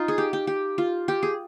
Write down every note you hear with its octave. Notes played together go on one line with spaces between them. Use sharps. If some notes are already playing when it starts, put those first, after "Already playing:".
Already playing: D#4 F4
G#4
G4
G4
G4
F4
G4
G#4